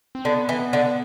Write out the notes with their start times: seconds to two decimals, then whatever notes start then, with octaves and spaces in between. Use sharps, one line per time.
0.15 C4
0.25 D3 B3
0.49 E3
0.73 D3